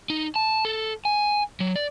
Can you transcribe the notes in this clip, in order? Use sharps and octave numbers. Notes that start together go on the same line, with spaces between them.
D#4
A5
A4
G#5
F#3
D5